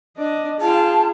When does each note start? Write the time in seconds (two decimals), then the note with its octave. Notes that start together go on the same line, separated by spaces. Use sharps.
0.18 D4 D5 D#5
0.61 F4 G#4 F5 G5 A5